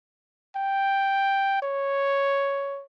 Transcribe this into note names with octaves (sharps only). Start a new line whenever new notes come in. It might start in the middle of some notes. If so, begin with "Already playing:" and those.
G5
C#5